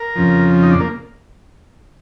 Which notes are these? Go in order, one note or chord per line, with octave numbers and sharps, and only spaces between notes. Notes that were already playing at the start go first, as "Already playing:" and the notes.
Already playing: A#4
F2 C#3 F3
D#4
D4
A#3